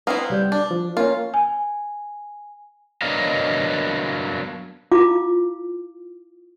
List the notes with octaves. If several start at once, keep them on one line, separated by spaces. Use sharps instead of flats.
B3 C4 E4 F5 A#5 D#6
C2 G3 G6
D4
F3
A#3 C#4 F4
G#5
F#3 B3 D4 A#4 D#5 F5
E4 F4 F5 D6